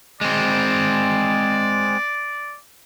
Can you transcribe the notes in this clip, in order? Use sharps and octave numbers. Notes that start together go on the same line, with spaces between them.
G#3 C4 D5